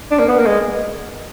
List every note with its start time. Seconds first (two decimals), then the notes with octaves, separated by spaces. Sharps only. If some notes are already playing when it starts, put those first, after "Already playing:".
0.11 D4
0.19 A#3
0.28 B3
0.39 A#3
0.46 G#3